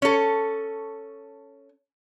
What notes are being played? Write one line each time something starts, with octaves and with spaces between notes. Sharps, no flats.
C#4 A4